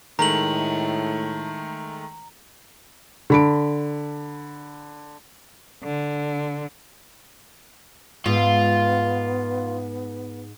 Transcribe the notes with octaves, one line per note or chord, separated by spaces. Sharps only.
A2 D#3 G#3 A3 A#5 F#7
D3 B5 D7
D3
G#2 B3 F4